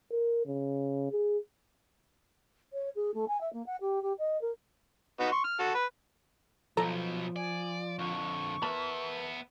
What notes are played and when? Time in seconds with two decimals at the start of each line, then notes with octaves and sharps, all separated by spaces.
0.11 A#4
0.46 C#3
1.12 G#4
2.73 C#5
2.95 G#4
3.14 A3
3.28 G#5
3.41 E5
3.53 A#3
3.66 F#5
3.81 G4
4.02 G4
4.18 D#5
4.41 A#4
5.20 B3 D#4 F#4
5.32 C6 C#6
5.44 F6
5.59 F#4 A4
5.75 B4
6.77 B1 B2 F3 A4 A#5
7.36 D5 G#5
7.99 F2 D3 C#6
8.62 B3 A#4 B4 E5 A5